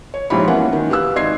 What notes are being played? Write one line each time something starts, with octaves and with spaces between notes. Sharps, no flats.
C#5
A#1 G#2 F3 G4 C#5 B5
B1 E3 A#3 C#4 F#5
D#3
G4 B4 F5 E6 F#6
G#1 D5 D#5 C6 G#6 C7